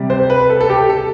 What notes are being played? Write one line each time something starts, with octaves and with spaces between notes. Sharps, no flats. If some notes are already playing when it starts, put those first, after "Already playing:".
Already playing: C3 G3
C5
B4
A4
A4
G4
A4